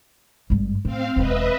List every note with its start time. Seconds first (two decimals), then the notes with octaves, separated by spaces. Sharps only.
0.50 G#1 G2
0.85 A2 C4 F5
1.16 E1 D#2 B4 D#5 E5